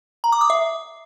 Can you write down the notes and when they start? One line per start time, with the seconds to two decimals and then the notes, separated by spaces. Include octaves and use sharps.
0.24 A#5
0.32 D6
0.41 D#6
0.50 E5